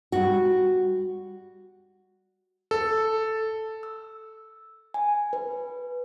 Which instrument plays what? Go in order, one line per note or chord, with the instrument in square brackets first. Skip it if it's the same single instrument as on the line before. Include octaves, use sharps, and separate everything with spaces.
[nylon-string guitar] G3 F#4
[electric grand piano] A4
[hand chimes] E6
G#5
B4